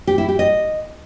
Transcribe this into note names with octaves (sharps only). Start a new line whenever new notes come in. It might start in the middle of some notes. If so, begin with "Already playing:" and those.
G4
E4
G4
D#5